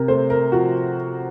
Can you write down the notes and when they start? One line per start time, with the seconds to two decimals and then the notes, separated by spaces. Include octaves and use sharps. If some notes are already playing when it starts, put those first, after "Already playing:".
Already playing: C3 A#4
0.08 A3 C5
0.30 A#4
0.52 F3 F#4